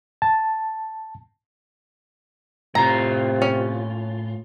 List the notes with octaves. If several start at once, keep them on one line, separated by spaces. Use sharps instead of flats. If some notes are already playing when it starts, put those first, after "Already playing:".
A5
A2 C3 F4 A#5
C#4